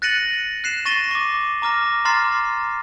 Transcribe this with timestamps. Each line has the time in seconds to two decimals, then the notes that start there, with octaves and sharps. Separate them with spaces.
0.02 F#6 A6 A#6 C#7 D#7 F#7
0.64 F#6 C7 E7
0.85 C#6 A6 A#6 D#7 G7
1.11 C#6 D6
1.62 A#5 D6 F6 A#6
2.05 A#5 C6 D6 F6 A6 C7